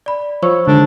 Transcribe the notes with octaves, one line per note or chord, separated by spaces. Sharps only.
D5 B5
F3 C5 C#5 C#6 E6
D3 D#3 G#3 D4